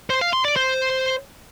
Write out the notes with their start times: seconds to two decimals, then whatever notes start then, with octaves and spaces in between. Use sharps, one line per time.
0.10 C5
0.21 F5
0.33 C6
0.45 D5
0.56 C5